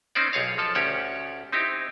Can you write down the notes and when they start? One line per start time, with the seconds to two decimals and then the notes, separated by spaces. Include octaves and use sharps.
0.15 C4 C#4 D#4 C5 D5
0.33 B1 G#4 C#5 F5
0.58 F3 A4 A5
0.75 D2 C#4 G4 C#5 F#5
1.52 C4 D#4 E4 G4